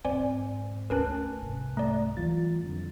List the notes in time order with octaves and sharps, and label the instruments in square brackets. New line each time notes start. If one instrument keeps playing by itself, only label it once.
[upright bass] E1 G#2 [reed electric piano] C4 [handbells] C5 D5 G#5
[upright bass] D2 [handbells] C#4 A#4 B4 [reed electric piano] G#5 A5 F#6
[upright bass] C2 G#2
[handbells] A3 D5 [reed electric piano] A#5
[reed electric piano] E3 F4 A6 [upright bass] F#3 G3
[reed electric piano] F2 D3